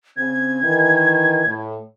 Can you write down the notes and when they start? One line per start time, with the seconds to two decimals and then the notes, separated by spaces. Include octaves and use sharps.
0.17 C#3 C4 G#6
0.63 D#3 E3
1.46 A2